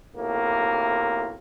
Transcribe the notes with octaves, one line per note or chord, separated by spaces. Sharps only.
B1 A2 C3 A#3